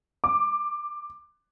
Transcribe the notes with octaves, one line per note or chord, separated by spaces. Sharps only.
D6